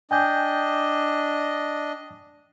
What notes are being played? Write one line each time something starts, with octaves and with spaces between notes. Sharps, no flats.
D4 D#5 G5 G#5 G6